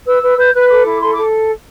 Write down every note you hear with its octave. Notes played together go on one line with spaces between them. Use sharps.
B4 E6
B4
B4 G6
B4 F#6
A4 D6
E4
A4 C6
D6
A4